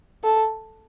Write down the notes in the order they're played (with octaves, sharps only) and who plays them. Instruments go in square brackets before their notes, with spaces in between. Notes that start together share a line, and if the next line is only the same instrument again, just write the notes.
[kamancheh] A4